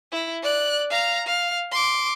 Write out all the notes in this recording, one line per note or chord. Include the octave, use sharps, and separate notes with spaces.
E4
D5 F#6
F5 A#5
F5
C6 D6